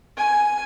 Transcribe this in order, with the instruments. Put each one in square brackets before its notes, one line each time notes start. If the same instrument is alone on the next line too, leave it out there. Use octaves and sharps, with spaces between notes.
[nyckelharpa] G#5